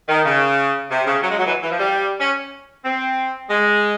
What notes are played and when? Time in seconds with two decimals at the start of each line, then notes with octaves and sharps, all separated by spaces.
0.09 D#3
0.25 C#3
0.90 C3
1.07 C#3
1.23 F#3
1.31 G#3
1.39 F#3
1.47 E3
1.63 E3
1.71 F3
1.80 G3
2.20 C#4
2.85 C4
3.50 G#3